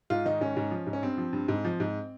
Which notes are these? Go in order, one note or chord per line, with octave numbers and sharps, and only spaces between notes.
G#2 F4
D#3 D#4
G#2 C#4
G#2
F3
G#2
C#4
G2 C4
F3
G2
G#2
F3
G#2